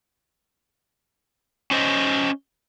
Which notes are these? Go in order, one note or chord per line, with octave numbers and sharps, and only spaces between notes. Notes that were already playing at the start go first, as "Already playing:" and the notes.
C#4 C5 D#5